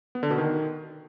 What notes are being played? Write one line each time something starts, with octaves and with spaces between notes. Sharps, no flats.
B3
D3
B2
D#3